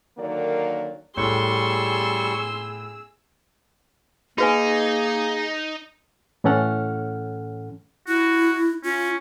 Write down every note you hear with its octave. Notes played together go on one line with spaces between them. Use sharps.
D3 D#3 F#3 A#3 A#4 D5
A2 G3 G#4 C6 C#6 E6
A#3 D#4 F#4 G#4 B4 G#5
A2 E3 C#4 A4 F#5 F6
E4 F#4
C#4 F4